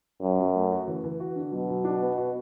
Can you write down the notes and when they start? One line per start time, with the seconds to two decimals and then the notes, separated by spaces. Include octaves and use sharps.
0.22 F#2 F#4
0.39 F#3
0.55 A3
0.72 F#4
0.87 E3
1.04 E3
1.20 F#4
1.36 D3
1.52 B2 F#3
1.69 F#3
1.84 D4
2.02 B3
2.17 F#4